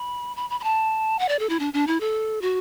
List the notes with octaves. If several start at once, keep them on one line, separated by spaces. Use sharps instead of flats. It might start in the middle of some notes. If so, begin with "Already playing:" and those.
Already playing: B5
B5
B5
B5
A5
F#5
D5
A4
E4
D4
D4
E4
A4
F#4